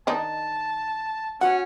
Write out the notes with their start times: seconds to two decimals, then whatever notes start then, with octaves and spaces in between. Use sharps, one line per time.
0.07 D#3 D4 D#4 A5
1.41 C#4 F#4 F#5